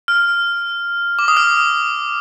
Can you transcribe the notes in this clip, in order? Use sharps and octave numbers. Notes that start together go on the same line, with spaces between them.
F6
D6
D#6
F6